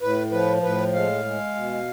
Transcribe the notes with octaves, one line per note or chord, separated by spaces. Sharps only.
A2 B4
F3 B4
A2 B4
G#3 F5
G#3
B2